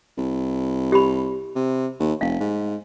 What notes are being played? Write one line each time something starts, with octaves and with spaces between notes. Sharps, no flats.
C2
G4 B5
C3
D#2
F1 F5
G#2